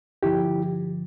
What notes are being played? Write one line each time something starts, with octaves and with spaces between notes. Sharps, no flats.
G2 D3 F3 E4 G4